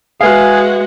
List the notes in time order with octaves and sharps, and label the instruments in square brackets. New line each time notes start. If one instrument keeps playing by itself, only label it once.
[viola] G#3 F#4 [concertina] G#4 [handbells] B4 E5 [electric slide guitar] F5